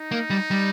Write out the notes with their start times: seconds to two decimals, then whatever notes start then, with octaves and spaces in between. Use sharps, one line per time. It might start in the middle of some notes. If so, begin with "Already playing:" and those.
Already playing: D#4
0.11 A#3
0.30 G3
0.50 G3